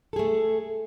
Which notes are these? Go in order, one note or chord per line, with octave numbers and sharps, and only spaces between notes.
A3 G#4 A4